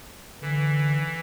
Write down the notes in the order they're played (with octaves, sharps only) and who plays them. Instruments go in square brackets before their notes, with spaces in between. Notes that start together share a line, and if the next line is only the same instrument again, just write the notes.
[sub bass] D3 [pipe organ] E3